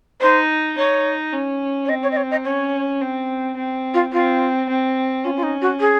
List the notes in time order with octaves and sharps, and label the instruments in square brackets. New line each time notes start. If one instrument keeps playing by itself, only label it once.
[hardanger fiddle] D#4 [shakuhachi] C5
[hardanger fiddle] D#4 [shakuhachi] C#5
[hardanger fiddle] C#4
[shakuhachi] C#5
[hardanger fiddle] C4 [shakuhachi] D#5
[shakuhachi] C#5
D#5
C#5
D#5
[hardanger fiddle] C#4 [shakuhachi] C#5
[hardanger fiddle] C4
C4
[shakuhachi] F4
[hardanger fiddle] C4 [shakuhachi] F4
[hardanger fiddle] C4
[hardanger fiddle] C#4 [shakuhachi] F4
[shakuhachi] F4
D#4
F#4
G#4